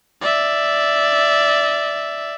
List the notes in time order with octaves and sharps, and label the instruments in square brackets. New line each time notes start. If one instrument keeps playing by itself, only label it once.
[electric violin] D5 E5